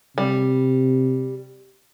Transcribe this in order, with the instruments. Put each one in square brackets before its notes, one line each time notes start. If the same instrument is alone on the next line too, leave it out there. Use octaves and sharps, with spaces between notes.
[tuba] C3 [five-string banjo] G3